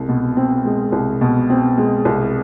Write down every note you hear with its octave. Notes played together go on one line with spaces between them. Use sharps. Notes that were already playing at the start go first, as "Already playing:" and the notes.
Already playing: C2 G#3
B2
C4
G#3
C2
B2
C4
G#3
C2